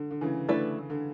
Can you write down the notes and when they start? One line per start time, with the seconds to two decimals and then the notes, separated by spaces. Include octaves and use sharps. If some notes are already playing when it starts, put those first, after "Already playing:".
Already playing: D3
0.11 D3
0.21 C#3 E3
0.48 D3 A3 E4 B4 D5
0.90 D3